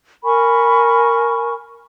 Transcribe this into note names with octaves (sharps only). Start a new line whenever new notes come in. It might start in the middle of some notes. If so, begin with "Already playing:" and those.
A#4 G#5 B5 C#6